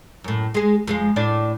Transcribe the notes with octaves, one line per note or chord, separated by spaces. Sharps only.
F#2 A2
G#3 G#4
F2 G#3 F5
A2 D4 D5